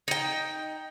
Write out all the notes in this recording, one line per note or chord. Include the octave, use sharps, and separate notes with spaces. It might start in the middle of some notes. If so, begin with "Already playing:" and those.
D#4 G5